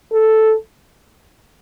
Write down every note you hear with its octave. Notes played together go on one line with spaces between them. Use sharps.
A4